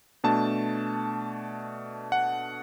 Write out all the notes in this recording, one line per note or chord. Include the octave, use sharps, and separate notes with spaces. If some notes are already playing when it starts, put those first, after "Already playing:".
B2 A3 D4 A5
F#5